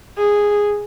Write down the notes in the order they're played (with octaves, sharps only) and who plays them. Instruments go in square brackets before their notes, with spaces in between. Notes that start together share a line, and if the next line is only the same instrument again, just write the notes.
[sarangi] G#4